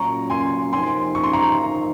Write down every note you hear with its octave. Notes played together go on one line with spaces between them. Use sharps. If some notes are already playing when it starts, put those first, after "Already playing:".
Already playing: A#2 F#3 C#4 A#5 C#6
G#5 C6
F2 C3 F3 A#3 D#4 G#5 C6
C#6
C6
A#5 C#6
F#2 F3 A#3 D#4